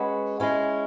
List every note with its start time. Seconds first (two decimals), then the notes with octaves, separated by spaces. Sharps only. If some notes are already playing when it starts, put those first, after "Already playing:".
Already playing: G#3 C#4 F#4 B4
0.40 G#3 C#4 E4